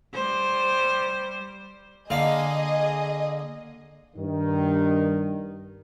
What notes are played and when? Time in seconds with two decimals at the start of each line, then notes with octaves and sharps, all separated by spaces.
0.14 G3 C5
2.10 D3 A#3 G#4 D#5 F5
4.16 G2 D#3